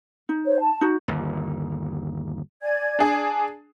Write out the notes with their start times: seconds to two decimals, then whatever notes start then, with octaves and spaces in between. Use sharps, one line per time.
0.29 D#4
0.46 C5 C#5
0.60 A5
0.81 D#4 F#4
1.08 G1 D#2
2.62 D5 G#5 G#6
2.99 D4 G#4